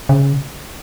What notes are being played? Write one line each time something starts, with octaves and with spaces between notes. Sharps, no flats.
C#3